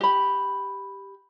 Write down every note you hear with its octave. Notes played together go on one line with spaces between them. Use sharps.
G4 B5